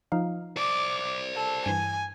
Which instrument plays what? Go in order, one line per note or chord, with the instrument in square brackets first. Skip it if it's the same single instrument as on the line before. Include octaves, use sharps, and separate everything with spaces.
[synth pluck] F3 D#4 F5
[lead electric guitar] C5 D5 [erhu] D6
[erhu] A4
[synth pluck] G2 E3 [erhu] G#5